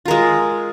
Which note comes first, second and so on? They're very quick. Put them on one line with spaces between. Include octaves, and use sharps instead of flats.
F4 A#4 G#3